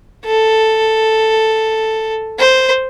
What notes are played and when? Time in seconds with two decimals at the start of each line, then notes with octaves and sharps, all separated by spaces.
0.25 A4
2.39 C5